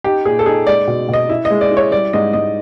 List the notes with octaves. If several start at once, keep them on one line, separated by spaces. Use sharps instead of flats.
D#4 G4
A#2 G#4
A4
D#4 G#4
G#3 D5
B2
B2 D#5
E4 E5
D#5
G#3
D5
E4
C#5
G3 D5
G#2 D#5
G#2 D#5